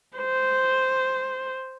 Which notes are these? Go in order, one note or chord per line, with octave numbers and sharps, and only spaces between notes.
C5